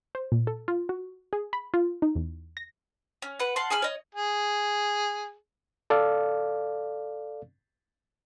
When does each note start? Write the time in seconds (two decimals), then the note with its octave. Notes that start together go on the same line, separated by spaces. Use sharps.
0.15 C5
0.32 A#2
0.47 A4
0.68 F4
0.89 F#4
1.33 G#4
1.53 B5
1.74 F4
2.02 D#4
2.15 E2
2.57 A#6
3.22 C#4
3.39 B4 F#5
3.56 F5 F#5 A5 C6
3.70 G#4 G#5 B5 F6
3.82 C#5 D#5
4.15 G#4
5.90 A4 D5 F5